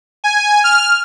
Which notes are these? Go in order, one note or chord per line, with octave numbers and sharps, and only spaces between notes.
G#5
F6